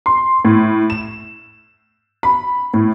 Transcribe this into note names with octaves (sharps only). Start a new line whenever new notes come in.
C6
A2
E7
B5
A2